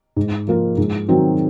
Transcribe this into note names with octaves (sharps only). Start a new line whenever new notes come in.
G#2
F3 A#3 F4
G#2
D#3 F#3 C4 F#4